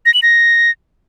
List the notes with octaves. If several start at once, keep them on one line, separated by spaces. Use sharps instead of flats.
A#6
F#7
A#6